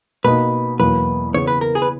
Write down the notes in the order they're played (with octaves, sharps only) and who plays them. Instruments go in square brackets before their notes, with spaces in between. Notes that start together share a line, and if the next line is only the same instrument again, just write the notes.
[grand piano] B2 A#3 D#4 [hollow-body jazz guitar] B4
[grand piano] E2 B2 F#3 A#3 [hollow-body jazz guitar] B4
[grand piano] C#3 E3 B3 [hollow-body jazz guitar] C#5
[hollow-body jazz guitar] B4
A#4
G#4
B4